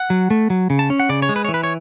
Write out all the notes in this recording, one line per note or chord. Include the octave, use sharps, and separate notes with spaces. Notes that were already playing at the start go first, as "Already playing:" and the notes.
Already playing: F#5
F#3
A3
F#3
C#3
A5
C#4
F#5
C#3 D5
C#5
G#3
B4
E3 C#5
B4
C#5